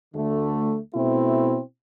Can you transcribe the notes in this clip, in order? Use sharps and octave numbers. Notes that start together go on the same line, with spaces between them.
D2 D3 A3
B2 A3 C4 E4